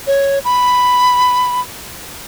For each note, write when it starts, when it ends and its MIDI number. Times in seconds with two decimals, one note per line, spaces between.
0.07 0.39 73
0.44 1.61 83